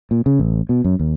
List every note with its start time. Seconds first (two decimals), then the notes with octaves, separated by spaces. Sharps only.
0.11 A#2
0.26 C#3
0.39 A1
0.69 B2
0.84 F#2
0.99 D#2